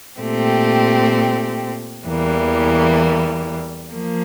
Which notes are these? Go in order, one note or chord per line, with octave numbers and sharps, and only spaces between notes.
A#2 A3 C4 G4
E2 E3 G3 A#3
F3 A#3